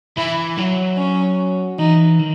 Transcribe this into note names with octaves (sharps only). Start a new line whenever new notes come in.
E3 E4
F#3
C#4
E3 D#4
D#3